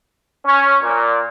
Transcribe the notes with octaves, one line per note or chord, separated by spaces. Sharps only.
C#4
A#2